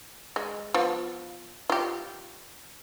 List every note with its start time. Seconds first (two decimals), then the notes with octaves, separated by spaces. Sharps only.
0.36 G#3
0.74 F3 B3
1.70 F4 G4